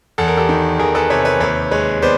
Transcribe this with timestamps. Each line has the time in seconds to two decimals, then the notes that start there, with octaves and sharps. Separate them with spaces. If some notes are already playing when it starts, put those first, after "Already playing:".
0.18 E2 A4
0.28 A#4
0.37 G4 A4
0.49 D#3
0.79 E2 G#4 A#4
0.95 A4 B4
1.10 C3 B4 C#5
1.25 B4 C#5
1.40 D#2 B4 C#5
1.71 G#3 B4 C#5
2.02 B3 C5 D5